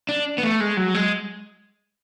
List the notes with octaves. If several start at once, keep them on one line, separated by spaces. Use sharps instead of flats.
D4
B3
A3
G#3
F#3
G#3